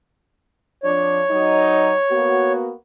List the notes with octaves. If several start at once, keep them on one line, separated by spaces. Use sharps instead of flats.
F2 F3 D4 C#5
F#3 D#4
A#3 B3 F#4